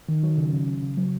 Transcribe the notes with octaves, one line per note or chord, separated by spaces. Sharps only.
D#3
F#3
C#3
C#3
C#3
C#3
F#3